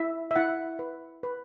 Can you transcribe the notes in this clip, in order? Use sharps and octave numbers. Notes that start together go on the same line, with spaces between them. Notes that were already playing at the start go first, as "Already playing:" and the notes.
Already playing: E4 E5
E5
E4 F#5
B4
B4